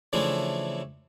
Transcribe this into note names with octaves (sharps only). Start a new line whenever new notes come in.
C#3 E3 F3 A3 D4 E4